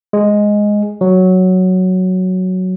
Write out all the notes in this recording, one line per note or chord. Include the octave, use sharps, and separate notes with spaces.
G#3
F#3